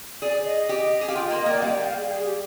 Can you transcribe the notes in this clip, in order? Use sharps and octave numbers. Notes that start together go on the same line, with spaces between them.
G#4 D5
D#5
G4
G#4
G4 F5
F4 G5
D#5
A#3
D#5
A#3 D5
G5
G3 F5
G5
F5
G#4
G#4
G4